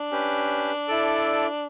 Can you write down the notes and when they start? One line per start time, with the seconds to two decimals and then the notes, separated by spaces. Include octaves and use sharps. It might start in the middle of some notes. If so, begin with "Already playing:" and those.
Already playing: D4
0.11 C#4 G4 B4
0.87 E4 A4 D5